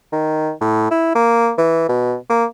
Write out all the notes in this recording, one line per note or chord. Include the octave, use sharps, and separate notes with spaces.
D#3
A2
E4
A#3
E3
B2
A#3